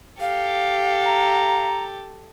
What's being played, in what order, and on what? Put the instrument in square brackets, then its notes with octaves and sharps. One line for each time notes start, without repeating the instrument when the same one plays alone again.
[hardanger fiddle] G4 A4 [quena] F5
[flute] A#5